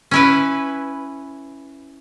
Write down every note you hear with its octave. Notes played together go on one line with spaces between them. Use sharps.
C#4 E4 B4